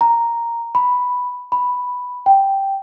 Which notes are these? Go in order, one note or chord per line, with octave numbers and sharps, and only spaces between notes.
A#5
B5
B5
G5